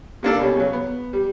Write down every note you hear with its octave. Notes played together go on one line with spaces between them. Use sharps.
C3 A#3 D4 A4
B2 G3 C#4
C#3 F#3
B3
G3